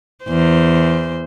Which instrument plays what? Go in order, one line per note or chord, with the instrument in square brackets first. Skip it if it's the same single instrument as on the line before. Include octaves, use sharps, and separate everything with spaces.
[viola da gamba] E2 C5